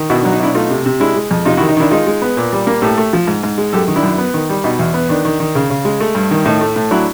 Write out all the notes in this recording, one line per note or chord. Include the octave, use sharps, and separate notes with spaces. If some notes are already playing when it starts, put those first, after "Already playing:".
Already playing: D#3
B2 E4 F#4
D4
F#3
D#4
B2 D4 E4
A3 D#4 F4
C3
C3
G#3 D4 E4
G#3
F2
C3 D#4 F4
E4 F#4
D#3
D#4
D#3 D4 E4
G#3 D#4 F4
G#3
B3
A#2
G3
A#3
A2 G4 A4
A3
F3
G#2
G#2
G#3
F#2 G4 A4
D#3
D4 E4
F#2
B3
D#3
G3
B2 D#4
E2
B3
D#3 D4
D#3
D#3
C#3
C#3
G#3
A3
G2
D#3
A2 D#4
A3
A2
F#3 D4 E4